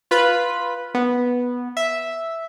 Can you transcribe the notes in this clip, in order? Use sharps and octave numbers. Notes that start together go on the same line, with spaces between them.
F4 B4 B5
B3
E5